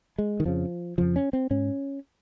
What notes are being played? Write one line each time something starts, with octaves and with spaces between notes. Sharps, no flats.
G#3
D#3
F2 C#3 F3
F2 C#3 F3
C#4
C4
G#2 C#4